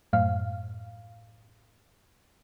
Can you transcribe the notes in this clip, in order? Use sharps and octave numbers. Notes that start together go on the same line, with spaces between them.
F#2 A2 F5